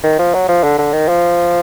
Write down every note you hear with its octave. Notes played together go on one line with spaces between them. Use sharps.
D#3
F3
F#3
F3
D3
D3
D#3
F3